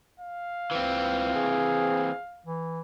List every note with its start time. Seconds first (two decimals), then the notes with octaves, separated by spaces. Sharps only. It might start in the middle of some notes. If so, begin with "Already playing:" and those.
0.20 F5
0.71 C#2 E3 C4
1.35 G#4
2.46 E3